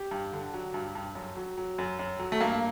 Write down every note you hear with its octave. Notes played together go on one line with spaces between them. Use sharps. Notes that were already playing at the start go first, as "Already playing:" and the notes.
Already playing: G4
G2
D3
F#3
G2
G2
F#2
F#3
F#3
F#2
F#2
F#3
A3
G2 A#3